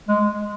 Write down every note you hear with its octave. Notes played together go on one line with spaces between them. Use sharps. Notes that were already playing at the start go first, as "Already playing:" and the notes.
G#3